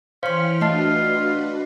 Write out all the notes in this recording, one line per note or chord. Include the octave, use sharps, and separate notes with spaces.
E3 C#4 C5 F5 G5 C6 F6
A3 D4 F4 F#4 B4 D#5 A5